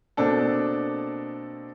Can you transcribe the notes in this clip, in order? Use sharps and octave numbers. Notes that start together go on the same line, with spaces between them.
B2 A#3 C4 D4 A4